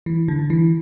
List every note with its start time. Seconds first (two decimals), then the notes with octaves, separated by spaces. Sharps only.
0.06 E3
0.28 D3
0.50 E3